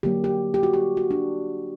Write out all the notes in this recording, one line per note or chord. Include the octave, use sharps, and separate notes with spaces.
D3 F#3 A#3 G4
G4
G4
F#4
G4
F#4
D4